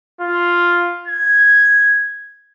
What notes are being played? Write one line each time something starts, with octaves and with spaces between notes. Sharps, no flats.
F4
G#6